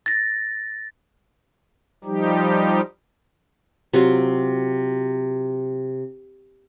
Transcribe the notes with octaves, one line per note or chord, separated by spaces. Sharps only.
A6 A#6
F3 G3 D#4 G4
C3 F#3 F4 C6